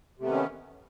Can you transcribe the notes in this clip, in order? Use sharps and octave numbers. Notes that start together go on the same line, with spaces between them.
C3 D#3 A3 B3 C#4